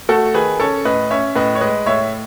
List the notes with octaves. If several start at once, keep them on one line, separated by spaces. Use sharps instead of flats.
A3 F#4 A4
D#3 G#4 B4
C#4 A4 C#5
A2 B4 D#5
C#4 C#5 E5
A2 B4 D#5
C#5
G#3 B4 D#5
A2 C#5 E5